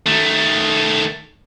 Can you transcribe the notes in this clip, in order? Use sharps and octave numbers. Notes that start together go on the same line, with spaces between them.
D#3 A3